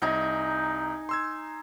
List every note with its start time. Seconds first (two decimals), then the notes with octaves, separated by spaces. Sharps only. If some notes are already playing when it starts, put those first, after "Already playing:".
0.02 C2 D#4 G#5 A#5
1.09 C6 E6 G#6